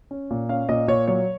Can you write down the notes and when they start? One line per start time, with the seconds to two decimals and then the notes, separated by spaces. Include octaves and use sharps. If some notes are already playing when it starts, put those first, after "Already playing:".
0.11 C#4
0.31 A#2
0.49 C#4 F5
0.69 A#2 D#5
0.88 A#2 C#5
1.07 F#3 C#5